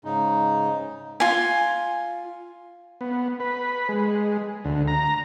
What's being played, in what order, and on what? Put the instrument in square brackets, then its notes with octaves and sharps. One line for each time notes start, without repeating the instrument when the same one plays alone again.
[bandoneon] G#2 C#3 D#4
[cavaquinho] F4 G#5
[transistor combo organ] B3
B4
G#3
D2
A#5